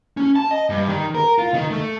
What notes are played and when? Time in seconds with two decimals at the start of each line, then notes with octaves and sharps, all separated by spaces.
0.17 C#4
0.36 A5
0.51 D#5
0.70 G2
0.87 D#3
1.15 A#4
1.38 F4
1.54 D#3
1.71 A3